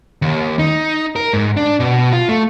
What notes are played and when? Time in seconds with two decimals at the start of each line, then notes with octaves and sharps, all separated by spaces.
0.22 D#2
0.59 D#4
1.16 A#4
1.33 G#2
1.57 D4
1.80 B2
2.13 F4
2.29 A3